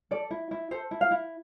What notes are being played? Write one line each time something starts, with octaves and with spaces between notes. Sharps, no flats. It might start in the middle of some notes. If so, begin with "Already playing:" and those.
A4 D5
E4
E4
A4 C5
E4
F5
E4